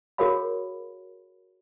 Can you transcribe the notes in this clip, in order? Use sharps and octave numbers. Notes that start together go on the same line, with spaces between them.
F#4 G#4 A#4 C#5 F5 B5